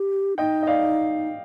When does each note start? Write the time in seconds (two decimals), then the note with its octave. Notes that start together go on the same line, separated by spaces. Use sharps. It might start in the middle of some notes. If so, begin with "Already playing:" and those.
Already playing: G4
0.38 D#4 D#5 G5
0.63 D#5
0.67 D5 F5